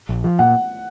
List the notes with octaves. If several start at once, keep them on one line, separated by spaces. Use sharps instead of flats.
A#1
F3
A#2 F#5